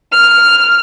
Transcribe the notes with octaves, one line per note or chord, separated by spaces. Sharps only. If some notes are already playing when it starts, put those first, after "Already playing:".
F6